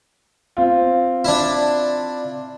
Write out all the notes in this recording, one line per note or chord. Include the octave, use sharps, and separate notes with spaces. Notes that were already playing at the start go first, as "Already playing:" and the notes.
C4 F4
D4 E4